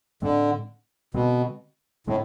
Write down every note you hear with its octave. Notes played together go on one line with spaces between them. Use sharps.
A2 D3 G#3 C4
B2 D3 G#3 C4
A2 D3 G#3 C4